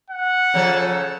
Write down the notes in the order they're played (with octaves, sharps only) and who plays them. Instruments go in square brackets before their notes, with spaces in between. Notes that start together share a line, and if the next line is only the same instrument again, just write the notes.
[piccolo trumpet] F#5
[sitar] C#3 F3 A4